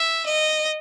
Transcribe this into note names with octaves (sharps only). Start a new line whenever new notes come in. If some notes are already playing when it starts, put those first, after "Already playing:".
Already playing: E5
D#5